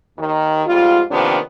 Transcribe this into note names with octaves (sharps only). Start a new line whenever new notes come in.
D#2 D#3
F2 G#2 G3 F4
C3 D#3 F3 A#3 B3 D4